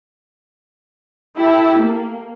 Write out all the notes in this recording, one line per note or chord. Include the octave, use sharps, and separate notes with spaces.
E4 G4 A4
A#3